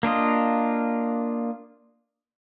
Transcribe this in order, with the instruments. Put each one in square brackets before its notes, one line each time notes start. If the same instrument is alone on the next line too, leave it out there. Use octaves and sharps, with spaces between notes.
[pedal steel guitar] A#3 D4 F4 D#5